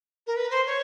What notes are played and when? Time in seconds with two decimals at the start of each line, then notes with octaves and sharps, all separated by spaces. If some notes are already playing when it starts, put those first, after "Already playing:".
0.27 A#4
0.36 B4
0.50 C5
0.66 C#5